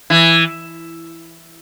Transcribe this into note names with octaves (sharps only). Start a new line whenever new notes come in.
E3